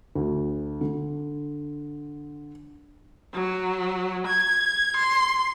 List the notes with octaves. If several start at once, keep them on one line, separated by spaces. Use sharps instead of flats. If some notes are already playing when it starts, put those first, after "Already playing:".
D2
D3
F#3
G#6
C6